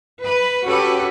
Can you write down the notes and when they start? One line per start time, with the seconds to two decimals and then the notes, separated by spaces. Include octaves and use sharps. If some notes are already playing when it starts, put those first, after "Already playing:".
0.24 B4
0.65 C#4 F#4 G4 A4 B4